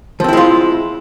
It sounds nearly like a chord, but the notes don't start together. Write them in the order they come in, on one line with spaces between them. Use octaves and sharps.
F3 C4 E4 G#3 F4